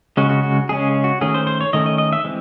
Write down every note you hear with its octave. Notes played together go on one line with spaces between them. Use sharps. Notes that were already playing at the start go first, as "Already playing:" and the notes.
C#3 G#3 C#4 F#4
F#4
F#4
C#3 G#3 C#4 G#4
F#4
D#3 A3 C#4 G#4
C5
C5
C#5
D#3 A3 C#4 D#5
D#5
D#5
E5
E3 G#3 C4